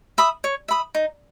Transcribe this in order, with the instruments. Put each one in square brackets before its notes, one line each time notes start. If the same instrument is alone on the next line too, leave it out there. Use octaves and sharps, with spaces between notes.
[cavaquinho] E5 B5 D#6
C#5
E5 B5 D#6
D#4